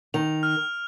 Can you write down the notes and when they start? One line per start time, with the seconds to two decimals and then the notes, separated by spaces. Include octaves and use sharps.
0.14 D#3 F7
0.43 F6